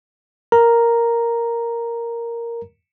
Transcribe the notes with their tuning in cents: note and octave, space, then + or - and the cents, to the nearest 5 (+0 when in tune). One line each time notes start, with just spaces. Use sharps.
A#4 +0 A#5 +0